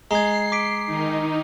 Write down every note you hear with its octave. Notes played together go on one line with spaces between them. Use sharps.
G#3 A#5 G#6 C7
D6 B6 D7
D#3 D#4